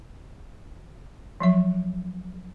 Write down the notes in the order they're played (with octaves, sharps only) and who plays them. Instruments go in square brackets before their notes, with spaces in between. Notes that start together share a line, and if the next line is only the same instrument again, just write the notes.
[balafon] F3 F#3 E5